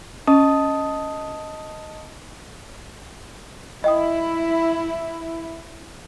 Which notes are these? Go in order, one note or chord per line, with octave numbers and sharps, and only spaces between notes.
C#4 D#5 A5 D#6
E4 D#5 G5 D#6